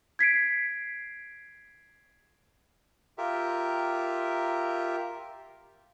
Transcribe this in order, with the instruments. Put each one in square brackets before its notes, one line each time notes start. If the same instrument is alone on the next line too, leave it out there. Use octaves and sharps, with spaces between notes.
[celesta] G#6 B6 C7 D7
[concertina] F4 G4 A#4 E5